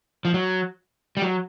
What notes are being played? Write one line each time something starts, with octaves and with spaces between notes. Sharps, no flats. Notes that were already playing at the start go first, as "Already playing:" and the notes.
F3
F#3
G3
F#3